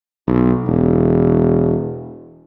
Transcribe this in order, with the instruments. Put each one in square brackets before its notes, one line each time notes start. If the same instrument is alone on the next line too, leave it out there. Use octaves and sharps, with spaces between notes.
[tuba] B1
E1